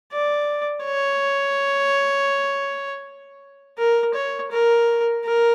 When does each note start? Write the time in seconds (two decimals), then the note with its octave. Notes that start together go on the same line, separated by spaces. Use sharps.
0.12 D5
0.85 C#5
3.78 A#4
4.14 C#5
4.51 A#4
5.25 A#4